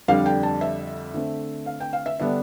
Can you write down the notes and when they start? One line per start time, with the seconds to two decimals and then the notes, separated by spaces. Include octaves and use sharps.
0.08 F2 D3 G3 D4 F5
0.26 G5
0.43 A5
0.61 E5
1.14 D3 A3 C4
1.66 F5
1.80 G5
1.93 F5
2.06 E5
2.20 D3 G3 B3 D4 E5